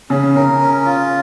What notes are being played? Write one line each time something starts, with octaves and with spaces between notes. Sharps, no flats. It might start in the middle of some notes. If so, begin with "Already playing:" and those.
C#3 C#4
C#3 A#4
C#4
F4